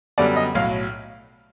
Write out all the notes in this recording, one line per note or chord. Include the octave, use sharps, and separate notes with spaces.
F#2 D3 G3 B3 D5
D#5
B1 A2 F#3 F5